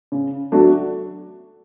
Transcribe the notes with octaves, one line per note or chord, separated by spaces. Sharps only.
C#3
F#3 A3 D4 F#4